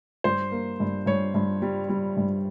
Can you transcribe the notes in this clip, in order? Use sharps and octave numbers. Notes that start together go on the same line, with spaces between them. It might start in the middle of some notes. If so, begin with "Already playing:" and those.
G2 C5
A#3
G2
G2 C#5
G2
G3
G3
G2